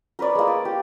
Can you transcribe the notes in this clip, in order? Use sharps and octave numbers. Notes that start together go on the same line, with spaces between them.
A#4 B4 C#5 D5
G#3 A#3
D5
G4